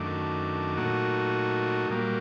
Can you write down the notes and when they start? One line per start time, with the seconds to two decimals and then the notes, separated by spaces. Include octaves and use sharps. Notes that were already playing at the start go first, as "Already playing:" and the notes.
Already playing: F#2 D#3 A3 D4
0.77 A#2 F#3 A3 D#4 F#4
1.90 A#2 G3 A#3 F#4